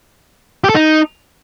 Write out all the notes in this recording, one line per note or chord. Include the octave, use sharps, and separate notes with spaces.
G4
A4
D#4